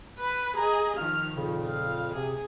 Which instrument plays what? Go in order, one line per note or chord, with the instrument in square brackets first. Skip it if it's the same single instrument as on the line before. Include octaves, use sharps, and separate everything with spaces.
[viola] B4 B5
[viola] G#4 D#5 [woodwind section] A#5
[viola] D#3 F3 [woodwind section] F6
[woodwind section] F2 A#2 C#3
[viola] F5
[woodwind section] C3 [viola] G#4